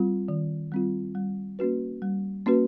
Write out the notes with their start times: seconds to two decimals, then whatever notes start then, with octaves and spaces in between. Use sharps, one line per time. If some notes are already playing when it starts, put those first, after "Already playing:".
Already playing: G3 C4 F4
0.28 D#3
0.72 G3 C4 F4
1.15 G3
1.59 A#3 C#4 F#4 B4
2.02 G3
2.46 A#3 C#4 F#4 B4